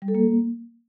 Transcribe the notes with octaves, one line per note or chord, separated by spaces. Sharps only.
G3
A4
A#3